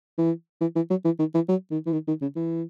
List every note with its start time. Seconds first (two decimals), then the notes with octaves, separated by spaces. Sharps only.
0.18 E3
0.61 E3
0.76 E3
0.90 F#3
1.05 E3
1.19 D#3
1.35 E3
1.49 F#3
1.71 D#3
1.86 E3
1.92 D#3
2.08 D#3
2.22 C#3
2.36 E3